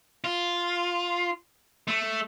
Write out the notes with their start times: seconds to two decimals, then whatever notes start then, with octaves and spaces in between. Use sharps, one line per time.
0.24 F4
1.88 A3